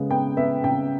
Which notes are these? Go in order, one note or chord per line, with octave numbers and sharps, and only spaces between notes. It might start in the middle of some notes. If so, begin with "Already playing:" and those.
Already playing: C#3 G#3 B3
B3 G5
B3 E5
C#3 G5